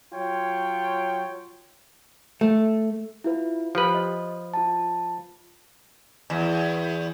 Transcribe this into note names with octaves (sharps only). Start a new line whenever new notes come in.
F#3 F4 C#5 G5
A3
E4 F4 B4
F3 G4 B4
D#5
F4 A5
E2